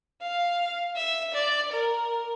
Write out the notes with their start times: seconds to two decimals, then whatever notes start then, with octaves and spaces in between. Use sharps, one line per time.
0.21 F5
0.96 E5
1.34 D5
1.72 A#4